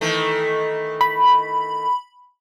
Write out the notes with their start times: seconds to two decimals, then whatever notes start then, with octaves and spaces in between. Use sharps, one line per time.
0.01 D#3 E3 A3
1.01 B5